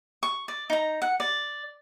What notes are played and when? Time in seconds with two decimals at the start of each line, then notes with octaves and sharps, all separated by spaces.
0.23 C#6
0.48 D5
0.70 D#4 A#5
1.02 F#5
1.20 D5